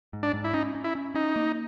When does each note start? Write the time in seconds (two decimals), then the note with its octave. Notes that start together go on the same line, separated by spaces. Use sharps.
0.13 G#2
0.23 D4
0.33 G#2
0.44 E4
0.53 C#4 D#4
0.75 C#4
0.84 E4
0.95 C#4
1.14 C#4 D#4
1.36 A#3